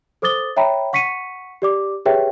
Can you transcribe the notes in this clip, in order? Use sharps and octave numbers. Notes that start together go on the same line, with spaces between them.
A4 C5 D6 D#6 A6 G7
C#5 E5 G5 A#5 B5
F#5 C#6 B6 C#7 D#7
G4 D5 D6
G4 G#4 B4 C#5 E5 G5